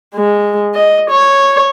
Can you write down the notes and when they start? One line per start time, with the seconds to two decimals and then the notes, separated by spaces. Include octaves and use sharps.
0.15 G#3
0.75 D#5
1.10 C#5